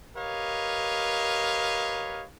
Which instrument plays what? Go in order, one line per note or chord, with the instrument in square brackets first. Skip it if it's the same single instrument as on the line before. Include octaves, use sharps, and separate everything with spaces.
[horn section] G4 A#4 B4 C#5 D#5 F5